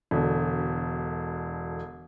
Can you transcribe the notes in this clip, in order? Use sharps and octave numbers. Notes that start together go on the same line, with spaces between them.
E1 B2 D3